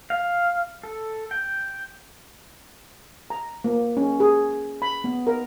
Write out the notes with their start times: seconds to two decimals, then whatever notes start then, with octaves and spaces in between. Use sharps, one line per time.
0.10 F5
0.83 A4
1.31 G5
3.30 A#5
3.64 A#3
3.97 C#4
4.20 G#4
4.82 B5
5.04 B3
5.27 A#4